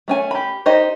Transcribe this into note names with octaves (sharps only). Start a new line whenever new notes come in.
A3 C#4 G#5
G4 B5
D#4 G4 C5 D#5